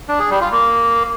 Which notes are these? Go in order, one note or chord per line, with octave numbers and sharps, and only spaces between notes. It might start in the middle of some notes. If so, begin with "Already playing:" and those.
D4
G#4
G3
F4
A#3